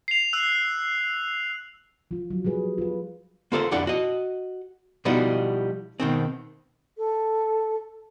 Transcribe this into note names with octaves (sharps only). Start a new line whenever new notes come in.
C7 F7
E6 F#6
F3 F4
F#3
F3 G3 G#4 B4
F4 B4
A#3 F4 A4 C5
C2 F2 D4 E4 F#5
F#4 D#5
B2 F3 G3 D#4 E4 F#4
B2 D#3 C4
A4